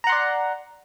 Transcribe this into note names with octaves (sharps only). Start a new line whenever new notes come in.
D5 F#5 A#5 C6